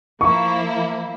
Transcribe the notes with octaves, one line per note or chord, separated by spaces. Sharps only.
F3 A#3 E4 C#6